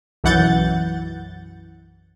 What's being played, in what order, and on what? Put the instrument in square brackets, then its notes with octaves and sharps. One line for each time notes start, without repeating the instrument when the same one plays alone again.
[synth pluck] B1 F#2 E3 F#5 G6 A6